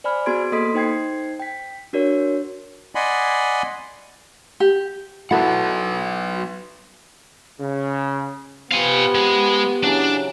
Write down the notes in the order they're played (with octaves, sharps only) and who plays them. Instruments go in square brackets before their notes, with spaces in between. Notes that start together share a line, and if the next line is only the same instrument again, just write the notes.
[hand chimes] C5 D5 G#5 B5 F6
B3 F#4 G#4 C6 G#6 D7
A#3 A4 D#5 C6 D#6 B6
D#4 C5 G5 G#6 C7
G5 B6
D4 F#4 A#4 C#5
[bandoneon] D5 D#5 F#5 G#5 B5 C6
[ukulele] G4
[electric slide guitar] F#3 B4 F#5 [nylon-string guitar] E4 F#4 A4
[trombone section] C#3
[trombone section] B3 [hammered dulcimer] F4 G4 C5 [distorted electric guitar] F5 G#5
[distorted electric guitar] G#3
[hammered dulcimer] C#3 E3 F#3 [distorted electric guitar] D4